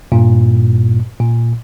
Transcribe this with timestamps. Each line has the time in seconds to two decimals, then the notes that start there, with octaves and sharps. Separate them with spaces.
0.12 G2 A#2
1.20 A#2